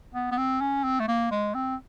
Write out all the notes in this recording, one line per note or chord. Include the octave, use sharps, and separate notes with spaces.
B3
B3
C4
C#4
C4
A3
A#3
G#3
C4